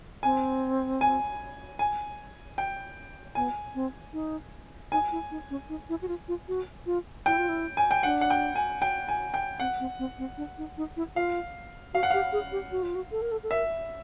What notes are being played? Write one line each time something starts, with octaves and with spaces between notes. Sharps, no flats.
C4 G#5
G#5
G#5
G5
B3 G#5
C4
D#4
D#4 G#5
E4
D#4
C#4
D#4
E4
F#4
F4
F4
F#4
F4
E4 G5
F4
E4
G#5
G5
D4 F#5
F#5
G5
G#5
G5
G#5
G5
C4 F#5
C4
C4
C4
D4
D#4
D#4
E4
F4 F5
F#4 F5
F#5
G4 F5
G#4
G4
F#4
F4
F#4
A4
A#4
A4
A4
A#4 E5